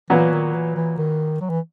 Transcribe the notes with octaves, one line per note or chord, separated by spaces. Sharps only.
A#2 E3 F#3 B3 F#4
D#3
E3
E3
D#3
F#3
E3